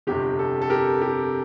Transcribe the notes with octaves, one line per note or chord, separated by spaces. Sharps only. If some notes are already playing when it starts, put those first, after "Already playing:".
G1 F2 C3 G4
A4
A4
G4 A#4
G4